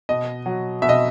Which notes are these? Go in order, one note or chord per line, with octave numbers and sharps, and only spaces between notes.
B2 D#5
F#3
B2 E5
D#5